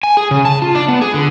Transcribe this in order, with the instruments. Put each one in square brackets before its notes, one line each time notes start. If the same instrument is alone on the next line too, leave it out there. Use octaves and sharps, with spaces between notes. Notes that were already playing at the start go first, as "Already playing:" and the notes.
[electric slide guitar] G#5
G#4
C#3
A5
F4
D4
B3
G#4
D3